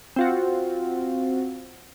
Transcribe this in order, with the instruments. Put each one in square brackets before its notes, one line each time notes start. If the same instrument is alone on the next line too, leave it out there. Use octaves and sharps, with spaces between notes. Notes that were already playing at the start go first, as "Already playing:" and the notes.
[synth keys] C4 F4 F#4